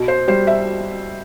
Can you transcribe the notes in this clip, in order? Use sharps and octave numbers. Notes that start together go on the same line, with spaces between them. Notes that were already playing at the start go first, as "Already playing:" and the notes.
Already playing: B2
C5
G3 C5
E5